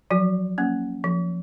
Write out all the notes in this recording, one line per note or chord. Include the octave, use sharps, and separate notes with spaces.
F3 F#3 F#4
A#3 C#4
F3